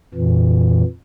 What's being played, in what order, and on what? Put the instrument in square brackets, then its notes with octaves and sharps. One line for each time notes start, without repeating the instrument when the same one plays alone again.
[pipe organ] F2 A#2 E3